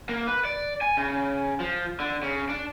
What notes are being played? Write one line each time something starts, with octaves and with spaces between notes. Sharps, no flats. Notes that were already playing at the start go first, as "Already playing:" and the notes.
A#3
B4
D5
G#5
C#3
F3
D3
C#3
D4